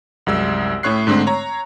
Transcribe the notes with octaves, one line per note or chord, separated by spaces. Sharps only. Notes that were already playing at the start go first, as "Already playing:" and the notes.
C2 F#2 G#3 E6
A2 C#4 C#5 C#6 F#6 C7
G#2 D3 G#3 A3 C4
C#5 A#5